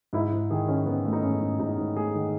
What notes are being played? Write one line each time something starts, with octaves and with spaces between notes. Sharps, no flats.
G#2 E4
G#2
D#3 G#4
D#3 C#4
D#3 B3
A3
D#4
G#2 C#4
G#2
G#2 D#4
G#2
A3 G#4
D#3